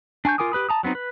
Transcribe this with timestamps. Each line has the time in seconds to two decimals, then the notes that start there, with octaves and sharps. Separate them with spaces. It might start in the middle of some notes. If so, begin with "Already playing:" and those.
0.25 D4 G#5 C#6 G6
0.38 F4 A#4 G#5 D6 D#6
0.52 G4 B4 B5 D#6
0.69 A5 A#5 D#6
0.83 F#3 B3 C4 D#4
0.95 B4